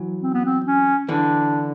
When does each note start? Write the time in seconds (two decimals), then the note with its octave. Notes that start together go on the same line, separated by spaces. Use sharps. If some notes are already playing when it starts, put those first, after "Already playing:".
Already playing: E3 F#3
0.23 C4
0.34 B3
0.46 C4
0.66 C#4
1.08 D3 E3 D4